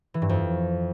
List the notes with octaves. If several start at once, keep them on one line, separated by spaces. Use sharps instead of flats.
E3
G2
F2